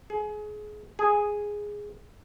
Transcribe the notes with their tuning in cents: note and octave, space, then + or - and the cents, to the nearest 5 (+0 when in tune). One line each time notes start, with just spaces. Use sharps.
G#4 +25
G#4 -5